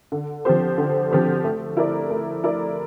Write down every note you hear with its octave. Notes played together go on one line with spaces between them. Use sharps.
D3
F3 C4 G4 C5
D3
F3 C4 G4 C5
A3
E4 A#4 D5
A3
E4 A#4 D5